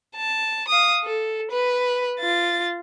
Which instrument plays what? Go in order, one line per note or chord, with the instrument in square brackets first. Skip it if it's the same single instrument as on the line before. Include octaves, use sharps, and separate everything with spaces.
[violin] A5
F5 D#6
A4
B4
F4 A6